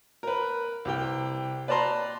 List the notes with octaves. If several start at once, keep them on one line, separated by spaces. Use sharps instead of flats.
A#4 B4
C2 G4 G5
B4 D5 A5 A#5 C6